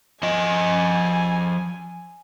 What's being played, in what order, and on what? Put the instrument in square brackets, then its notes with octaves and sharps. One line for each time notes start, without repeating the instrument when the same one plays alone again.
[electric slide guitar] F3 D#5 [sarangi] G#5